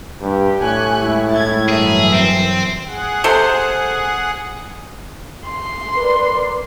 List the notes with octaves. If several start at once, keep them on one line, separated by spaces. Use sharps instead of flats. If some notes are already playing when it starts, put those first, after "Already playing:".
G2 G4
A2 G#5 C#6 F#6
G#3 E4
G#6 A6
G2 E3 F#3 G#4 A#4 E5
C4
G#4 F#5
C3 A4 C5
C6
A#4 B4 D5